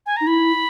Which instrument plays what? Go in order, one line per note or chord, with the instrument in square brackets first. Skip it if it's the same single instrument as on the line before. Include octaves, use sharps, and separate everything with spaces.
[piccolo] G#5
[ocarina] D#4 [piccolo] A#5
[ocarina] E4 [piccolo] B5